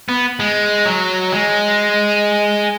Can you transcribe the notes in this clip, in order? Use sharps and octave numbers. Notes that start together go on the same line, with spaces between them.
B3
G#3
F#3
G#3